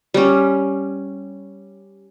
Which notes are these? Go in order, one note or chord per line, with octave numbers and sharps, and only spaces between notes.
G3 C#4